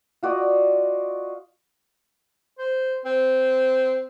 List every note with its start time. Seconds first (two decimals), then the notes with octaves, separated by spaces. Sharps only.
0.23 F4 F#4 D5 D#5
2.58 C5
3.05 C4